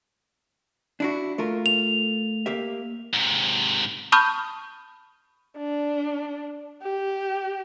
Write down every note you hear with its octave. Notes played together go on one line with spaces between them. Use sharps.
D4 E4 F#4
A3 F4 A#4
F7
A#3 G4 E5
G#2 C3
A5 B5 C#6 D#6 F6 G6
D4
G4